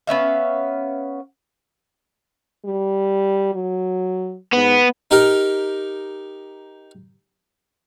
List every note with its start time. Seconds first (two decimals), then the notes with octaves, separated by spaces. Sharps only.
0.07 B3 C#4 E5 F5
2.65 G3
3.54 F#3
4.53 G#2 B3
5.11 D#4 G4 A#4